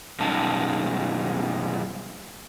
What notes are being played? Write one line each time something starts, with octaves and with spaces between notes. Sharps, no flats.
F#2 B2 G3 C#4 D#4 A5